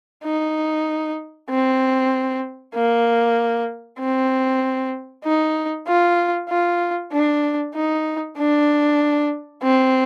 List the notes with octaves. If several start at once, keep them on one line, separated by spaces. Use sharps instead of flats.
D#4
C4
A#3
C4
D#4
F4
F4
D4
D#4
D4
C4